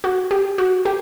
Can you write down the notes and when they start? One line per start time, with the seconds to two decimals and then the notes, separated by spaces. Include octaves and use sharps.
0.04 F#4
0.31 G4
0.58 F#4
0.85 G4